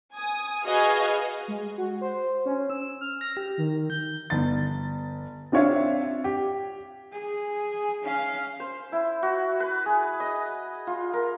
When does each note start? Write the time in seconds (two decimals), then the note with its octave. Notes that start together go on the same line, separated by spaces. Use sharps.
0.13 G#5 D#6
0.65 F#4 G#4 B4 D#5 F5 G#5
1.48 G#3
1.78 F#4
2.01 C5
2.46 C#4
2.70 E6
3.01 F6
3.21 A#6
3.37 G4
3.58 D#3
3.90 G6
4.30 G1 A6
5.52 C4 D4 F4 C#5 E5 F5
6.24 G4
7.12 G#4
8.03 C#4 F5
8.60 C5
8.92 E4
9.23 F#4
9.60 B4
9.86 G#4
10.20 D#5
10.87 F4
11.13 A#4